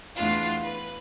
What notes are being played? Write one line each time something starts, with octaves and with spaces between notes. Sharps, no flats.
E2 A3 D4 F4 F5
B4